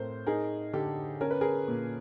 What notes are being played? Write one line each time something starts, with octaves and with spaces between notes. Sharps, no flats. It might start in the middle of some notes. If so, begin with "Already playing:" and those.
Already playing: A2 C4 A#4 C5
D#4 G#4 A#4
D3 G4 A4
C#4 A#4
B4
G#4 A#4
A#2